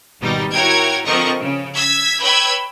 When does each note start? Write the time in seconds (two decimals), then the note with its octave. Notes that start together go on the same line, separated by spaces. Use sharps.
0.20 G#1 B2 G3 D#4
0.52 E4 F#4 A#4 C#5 G5 G#6
1.05 D3 F3 C4 A#4 D#5 C#6
1.41 C#3
1.75 E6 G#6 B6
2.20 B4 C#5 G5 B5 E6 G#6